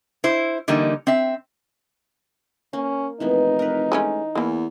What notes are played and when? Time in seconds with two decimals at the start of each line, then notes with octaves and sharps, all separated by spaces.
0.24 E4 C5
0.68 D3 E3 G3 A#3 D#4
1.07 C4 E5
2.73 A#3 C#4
3.20 F1 E3 A#3 B3 D#4
3.59 A#4 B4
3.92 G#3 A3 C#4
4.35 E2 E3 A#3